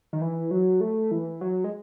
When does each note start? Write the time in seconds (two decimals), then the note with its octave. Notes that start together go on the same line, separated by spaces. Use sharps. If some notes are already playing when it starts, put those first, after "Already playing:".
0.13 D#3
0.21 E3
0.51 F#3
0.81 A3
1.11 E3
1.41 F#3
1.64 G#3